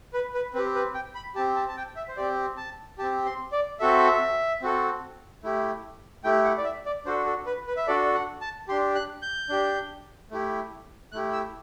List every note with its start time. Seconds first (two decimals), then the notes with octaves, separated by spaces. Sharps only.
0.13 B4
0.34 B4
0.54 C4 B4
0.58 G4
0.75 B4
0.94 G5
1.15 B5
1.35 C4 G4 A5
1.56 A5
1.68 A5
1.77 G5
1.96 E5
2.08 C5
2.17 C4 G4 D5
2.57 A5
2.98 G4 A5
3.03 C4
3.26 C6
3.52 D5
3.79 C4 F#4 A4 E5
4.62 C4 F#4 A4
5.43 A3 E4 G4
6.24 A3 E4 G4 G5
6.45 F#5
6.58 D5
6.64 E5
6.86 D5
7.06 D4 F#4 A4 C5
7.26 A4
7.46 B4
7.67 B4
7.77 E5
7.87 D4 F#4 A4 D5
8.15 F#5
8.41 A5
8.68 D4 G4 C6
8.95 F#6
9.22 G6
9.49 D4 G4
10.31 A3 E4 G4
11.12 A3 E4 G4 F#6
11.33 E6